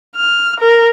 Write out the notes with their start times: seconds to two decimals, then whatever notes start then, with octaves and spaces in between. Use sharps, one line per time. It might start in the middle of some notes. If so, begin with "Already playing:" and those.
0.16 F6
0.60 A#4